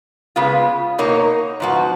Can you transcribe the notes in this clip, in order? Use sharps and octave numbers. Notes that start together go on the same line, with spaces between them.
C#3 G#3 B3 F4
B2 A#3 D#4 A#4 C#5
G#2 F3 B3 F#4